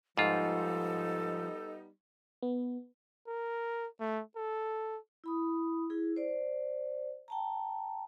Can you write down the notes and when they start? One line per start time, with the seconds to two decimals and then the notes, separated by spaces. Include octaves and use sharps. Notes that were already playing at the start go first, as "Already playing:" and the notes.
0.18 G#2 F3 G3 B3 D#4 F4 A4
2.42 B3
3.27 A#4
4.00 A3
4.36 A4
5.24 E4 B5 D#6
5.90 E4 G#4
6.16 C5 D5
7.28 G5 A5 A#5